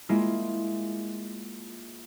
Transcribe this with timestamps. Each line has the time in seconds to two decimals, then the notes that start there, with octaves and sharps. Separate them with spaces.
0.09 G#3 A#3 E4 F4